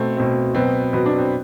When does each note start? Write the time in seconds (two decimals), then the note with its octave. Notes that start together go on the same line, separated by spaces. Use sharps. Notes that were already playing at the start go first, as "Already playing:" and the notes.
Already playing: B2 A3 C4
0.17 B2 A3 C4
0.54 B2 F#3 B3 C4
0.93 B2 F#3 B3
1.06 D4
1.18 C4